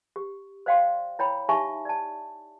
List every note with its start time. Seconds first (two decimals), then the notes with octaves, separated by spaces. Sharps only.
0.16 G4
0.66 C5 D5 F5 G5 C6
1.19 E4 C#5 G5 B5
1.49 D#4 G4 E5 G#5 A5 C#6
1.85 D5 A5